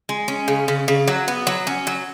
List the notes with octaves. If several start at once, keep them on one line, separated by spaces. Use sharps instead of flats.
G#3
C#4
C#3
C#3
C#3
F#3
B3
F#3
C#4
F#3